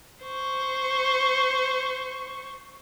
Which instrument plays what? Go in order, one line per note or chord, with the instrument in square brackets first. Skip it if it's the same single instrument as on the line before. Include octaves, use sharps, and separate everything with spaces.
[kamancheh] C5 C#6